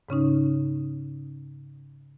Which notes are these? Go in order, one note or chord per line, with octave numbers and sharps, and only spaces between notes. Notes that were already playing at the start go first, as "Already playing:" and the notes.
G#2 C#3 C#4 D#4